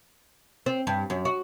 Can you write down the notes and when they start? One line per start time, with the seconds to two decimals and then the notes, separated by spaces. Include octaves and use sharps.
0.66 C4
0.87 G2
1.10 F#2
1.25 F#4